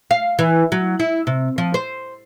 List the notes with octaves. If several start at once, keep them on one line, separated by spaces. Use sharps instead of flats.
F5
E3
F#3
E4
C3
F3
C5